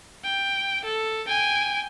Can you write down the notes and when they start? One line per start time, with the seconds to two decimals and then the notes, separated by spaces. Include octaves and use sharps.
0.25 G5
0.85 A4
1.28 G5 G#5